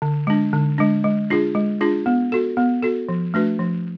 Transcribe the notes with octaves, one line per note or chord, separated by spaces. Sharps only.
D3
G#3 D4
D3
G#3 D4
G#3
D4 F4 G#4
G#3
D4 F4 G#4
B3
F#4 A4
B3
F#4 A4
F3
A3 D4 F#4 B4
F3